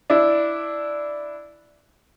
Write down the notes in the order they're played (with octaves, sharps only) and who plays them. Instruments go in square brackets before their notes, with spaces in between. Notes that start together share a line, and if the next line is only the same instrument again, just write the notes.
[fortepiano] D4 E4